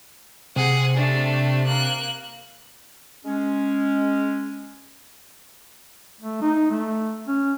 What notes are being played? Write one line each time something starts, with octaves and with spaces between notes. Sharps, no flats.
C3 G#4 F#5
A3 D4
A#3 F#6
G#3 C#4
A3
D#4
A3
C#4